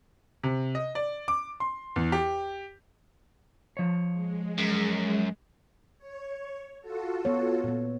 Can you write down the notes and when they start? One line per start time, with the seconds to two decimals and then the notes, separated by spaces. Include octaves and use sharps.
0.43 C3
0.75 D#5
0.95 D5
1.28 D6
1.60 C6
1.96 E2
2.12 G4
3.77 F3 C#5
4.11 G#3
4.58 F#2
5.98 C#5
6.81 F4 F#4 A4
7.25 B3 C#5
7.64 A#2 B3